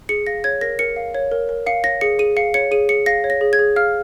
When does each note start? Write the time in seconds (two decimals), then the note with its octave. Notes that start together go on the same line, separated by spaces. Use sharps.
0.09 G#4 C#7
0.26 F5 A#6
0.44 C#5 G#6
0.61 A#4 A#6
0.79 A#4 C#7
0.96 F5
1.15 C#5
1.32 A#4
1.49 A#4
1.66 F5 C#7
1.84 C#5 A#6
2.01 G#4 C#7
2.19 G#4 D#7
2.36 F5 C#7
2.54 C#5 C#7
2.71 G#4 D#7
2.89 G#4 C#7
3.06 F5 A#6
3.24 C#5
3.30 A#6
3.41 G#4
3.53 G#6
3.59 G#4
3.76 F5 F6